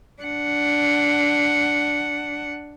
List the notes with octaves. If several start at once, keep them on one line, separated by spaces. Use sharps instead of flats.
D4 F#5